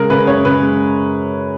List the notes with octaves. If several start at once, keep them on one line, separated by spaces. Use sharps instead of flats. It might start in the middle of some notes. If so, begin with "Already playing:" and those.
Already playing: C#3 G#3 G#4 A#4
C#3 B4
F#2 C#5
C#3 B4
G#3